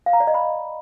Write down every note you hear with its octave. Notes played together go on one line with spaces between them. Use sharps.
F5
A#5
D5
D#5
B5